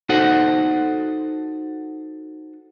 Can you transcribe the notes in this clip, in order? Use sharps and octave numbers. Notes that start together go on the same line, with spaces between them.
D#4 F#4 A4 C5 F#5